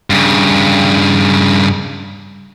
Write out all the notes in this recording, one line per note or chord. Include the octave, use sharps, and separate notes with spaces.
G2 C#3